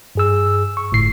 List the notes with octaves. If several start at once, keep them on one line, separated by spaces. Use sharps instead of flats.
G2 G#4 E6
C#6
G1 A2 C7